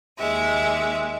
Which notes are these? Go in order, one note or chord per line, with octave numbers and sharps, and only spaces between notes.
D#2 G#3 E5